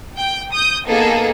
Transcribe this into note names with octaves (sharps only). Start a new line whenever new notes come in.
G5
D#6 G6
A#3 B3 D#4 G#4 A4